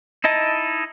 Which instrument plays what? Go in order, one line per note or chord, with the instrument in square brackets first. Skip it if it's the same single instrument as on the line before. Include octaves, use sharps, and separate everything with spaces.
[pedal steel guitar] D#4 E4 D#5 A5